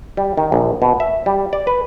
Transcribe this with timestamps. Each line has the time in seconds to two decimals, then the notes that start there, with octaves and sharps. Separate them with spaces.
0.17 G3
0.37 D#3
0.52 A#1
0.82 B2
1.00 E5
1.26 G3
1.53 D5
1.67 B4